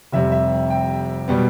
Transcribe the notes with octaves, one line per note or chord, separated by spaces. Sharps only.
F1 F2 C3 G3 E5
E5
G5
B2 G3 B3